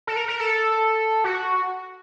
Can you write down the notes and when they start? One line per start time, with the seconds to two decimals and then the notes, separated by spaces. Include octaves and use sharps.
0.07 A4
0.16 A#4
0.28 A#4
0.40 A4
1.24 F#4